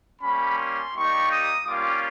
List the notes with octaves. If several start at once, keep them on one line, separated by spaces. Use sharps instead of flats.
G3 A#3 C#4 B5
C6
G3 A#3 D#4 G4 C#6
D#6
G3 A#3 C#4 F4 D6